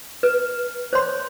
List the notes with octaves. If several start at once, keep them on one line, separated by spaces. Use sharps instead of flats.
B4
C5 C#5 C6